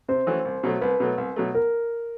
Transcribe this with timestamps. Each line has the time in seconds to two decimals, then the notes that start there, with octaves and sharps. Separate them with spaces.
0.08 C3 C5
0.27 E3 A3 C#4 F#4
0.45 C2
0.63 B2 F#3 A3
0.81 C2 B4
1.00 B2 F#3 A3
1.18 C2
1.36 B2 F#3 A3
1.55 A#4